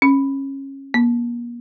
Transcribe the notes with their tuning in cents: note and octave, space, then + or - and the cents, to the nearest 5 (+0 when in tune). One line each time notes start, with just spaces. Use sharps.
C#4 -20
A#3 +40